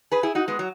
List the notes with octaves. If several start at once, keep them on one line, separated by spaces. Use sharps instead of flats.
G#4 B4
E4 G#4
D#4 F#4
G#3 B3
F#3